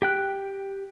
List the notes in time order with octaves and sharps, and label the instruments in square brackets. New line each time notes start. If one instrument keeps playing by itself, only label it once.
[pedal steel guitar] G4 G5 F#6